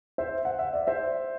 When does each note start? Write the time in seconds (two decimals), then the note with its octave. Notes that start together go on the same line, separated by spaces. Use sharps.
0.18 C5 E5
0.45 F#5
0.59 E5
0.73 D5
0.87 C5 E5